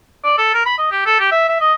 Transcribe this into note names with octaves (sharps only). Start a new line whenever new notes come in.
D5
A4
A#4
B5
D#5
G4
A4
G4
E5
E5
D#5